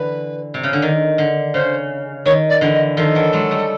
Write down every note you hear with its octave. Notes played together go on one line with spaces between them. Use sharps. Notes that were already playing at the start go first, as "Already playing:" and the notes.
Already playing: D3 E3 B4
C3
C#3
D3
D#3
D3
C#3 C5
D#3 C#5
D5
D3 E3
D#5
D#3 F3 A4
E3 F#3
F#3 G#3
G3 A3